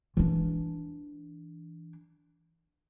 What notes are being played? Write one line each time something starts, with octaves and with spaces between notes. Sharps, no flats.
E3 D4